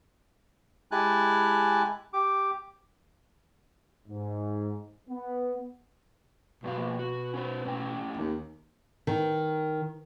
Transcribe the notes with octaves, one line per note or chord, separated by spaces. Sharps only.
G#3 E4 G4 G#5 A5 F#6
G4 D6
G#2
B3
G2 B2 F#3 F5
F3 A#3
F#4
C#4 B4 C5
A2 C#4 G5
D#2
D#3